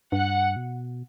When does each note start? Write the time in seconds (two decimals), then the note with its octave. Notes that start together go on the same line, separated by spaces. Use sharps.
0.12 G2 F#5
0.56 B2